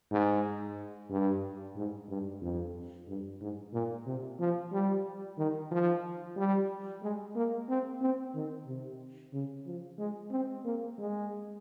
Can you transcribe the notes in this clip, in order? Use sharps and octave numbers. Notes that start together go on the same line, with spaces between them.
G#2
G2
G#2
G2
F2
G2
G#2
A#2
C3
F3
G3
D#3
F3
G3
G#3
A#3
C4
C4
D#3
C3
C#3
F3
G#3
C4
A#3
G#3